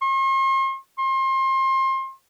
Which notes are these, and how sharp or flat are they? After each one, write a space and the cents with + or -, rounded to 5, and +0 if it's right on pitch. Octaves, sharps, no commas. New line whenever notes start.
C6 +45
C6 +30